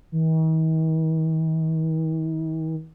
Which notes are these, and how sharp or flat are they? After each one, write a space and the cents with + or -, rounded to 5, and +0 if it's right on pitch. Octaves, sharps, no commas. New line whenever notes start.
D#3 +45